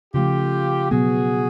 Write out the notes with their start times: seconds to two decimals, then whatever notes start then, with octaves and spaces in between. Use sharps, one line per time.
0.14 C#3 F3 A3 F4 G4
0.91 B2 F#3 B3 F#4 G#4